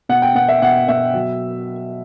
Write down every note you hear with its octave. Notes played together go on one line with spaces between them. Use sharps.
B2 F#5
G5
B2 F#5
E5
B2 F#5
B2 E5
F#3